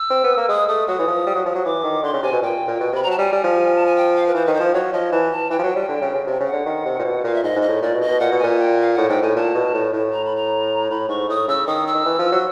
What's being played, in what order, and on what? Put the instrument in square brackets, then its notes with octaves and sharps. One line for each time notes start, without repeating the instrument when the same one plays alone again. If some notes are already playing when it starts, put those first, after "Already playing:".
Already playing: [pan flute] E6
[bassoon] C4
B3
A#3
[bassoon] G#3 [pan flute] D#6
[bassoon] A3 [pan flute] D#6
[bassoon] F#3 [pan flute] D#6
[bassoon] E3
F3
G3
F#3
F3
F#3
[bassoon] E3 [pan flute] D6
[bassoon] D#3
[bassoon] D3 [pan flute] C6
[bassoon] C#3
[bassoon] C3 [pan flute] G#5
[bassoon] B2
[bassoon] A#2 [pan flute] G5
[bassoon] A#2
B2
[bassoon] C3 [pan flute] B5
[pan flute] A#5
[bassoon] F#3 [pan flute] A5
[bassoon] G3 [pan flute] G#5
[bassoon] G3
F3
[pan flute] A5
G#5
G5
F5
B4
[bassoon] E3 [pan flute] C5
[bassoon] D#3 [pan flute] B4
[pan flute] C5
[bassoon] F3
[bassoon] F#3 [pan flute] C#5
[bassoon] F3 [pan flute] D#5
[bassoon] E3 [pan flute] A5
[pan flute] A5
[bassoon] E3 [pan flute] G5
[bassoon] F3
F#3
G3
D3
C#3
C#3
C3
C#3
[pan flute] F#5
[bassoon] D3
D#3
C3
A#2
B2
[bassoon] A#2 [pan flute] F5
[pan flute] E5
[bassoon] G#2 [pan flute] D#5
[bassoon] G#2
[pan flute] D#5
[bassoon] A2
[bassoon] A#2 [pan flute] D5
[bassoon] B2
[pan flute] D#5
[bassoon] B2
[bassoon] A#2 [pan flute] F#5
[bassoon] B2
[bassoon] A#2 [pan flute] G#5
[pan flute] G5
F5
[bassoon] A2 [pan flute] F#5
[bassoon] G#2 [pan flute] G5
[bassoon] A2 [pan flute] G#5
[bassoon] A#2 [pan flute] A5
[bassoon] B2
A2
A2
[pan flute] A#5
B5
A#5
[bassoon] A2 [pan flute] B5
[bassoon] G#2 [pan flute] C#6
[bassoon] A2 [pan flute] D#6
[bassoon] C#3 [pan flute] E6
[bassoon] D#3 [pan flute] D#6
[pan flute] E6
[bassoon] D#3
E3
F3
F#3